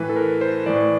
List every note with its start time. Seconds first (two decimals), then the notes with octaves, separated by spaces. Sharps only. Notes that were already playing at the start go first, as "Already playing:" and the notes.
Already playing: A2 E3 B4
0.09 A4
0.16 A#4
0.41 C5
0.66 A2 E3 D5